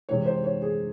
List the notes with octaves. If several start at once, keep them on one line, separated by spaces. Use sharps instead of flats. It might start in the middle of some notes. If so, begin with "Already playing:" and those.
C3 E3 G#3 C#5
C5
C#5
G#4